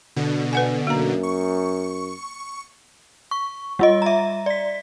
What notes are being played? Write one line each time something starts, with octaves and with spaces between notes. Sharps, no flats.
B2 D3
B4 F#5 G#5
F#2 A#3 A#5
C#6
C#6
G3 F4 D#5
E5 A#5
D5 B6